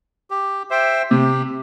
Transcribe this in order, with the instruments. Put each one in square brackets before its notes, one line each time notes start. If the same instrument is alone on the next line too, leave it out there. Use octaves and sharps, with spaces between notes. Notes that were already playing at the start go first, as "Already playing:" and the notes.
[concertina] G4
C5 E5 G5
[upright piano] C3 [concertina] G4